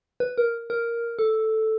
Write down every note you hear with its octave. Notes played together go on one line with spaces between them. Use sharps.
B4
A#4
A#4
A4